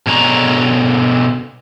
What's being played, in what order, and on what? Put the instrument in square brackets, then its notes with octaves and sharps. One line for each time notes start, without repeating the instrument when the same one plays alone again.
[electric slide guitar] B2 D3 G#4 C#5 A#5